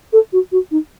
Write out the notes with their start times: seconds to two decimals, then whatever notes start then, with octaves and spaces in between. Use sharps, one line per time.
0.12 A4
0.32 F#4
0.51 F#4
0.70 D#4